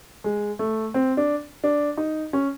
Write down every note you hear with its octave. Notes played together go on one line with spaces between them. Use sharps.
G#3
A3
C4
D4
D4
D#4
C#4